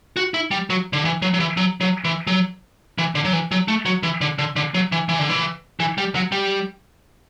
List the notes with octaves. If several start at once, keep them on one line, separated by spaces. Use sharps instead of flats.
F#4
E4
G3
F#3
D3
E3
F#3
F#3
E3
F#3
F#3
E3
F#3
E3
D3
F#3
E3
F#3
A3
F#3
E3
D3
D3
D3
F#3
E3
E3
D3
E3
E3
G3
F#3
G3